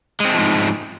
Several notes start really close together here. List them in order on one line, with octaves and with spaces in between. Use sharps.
G#3 C4 A3 F3 G#2